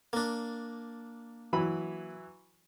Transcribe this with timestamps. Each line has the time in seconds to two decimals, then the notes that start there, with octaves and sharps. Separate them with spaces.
0.13 A#3 D4
1.53 E3 F#3 B5